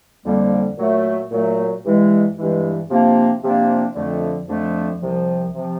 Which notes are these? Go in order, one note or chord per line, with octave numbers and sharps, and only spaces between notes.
F2 D3 G3 A#3
A#2 F#3 A3
A#2 F#3 A3
G2 E3 G#3
G2 E3 G#3
C3 F3 A#3 D4
C3 F3 A#3 D4
F2 D3 F3 A3
F2 D3 F3 A3
C2 C3 F3
C3 F3